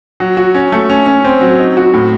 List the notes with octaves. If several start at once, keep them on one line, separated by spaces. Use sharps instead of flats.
F#3
F#4
C#4
A3
C#4
C#4
C4
F#3
D#4
F#4
A2